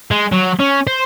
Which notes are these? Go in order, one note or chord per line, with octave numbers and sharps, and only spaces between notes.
G#3
F#3
C#4
C5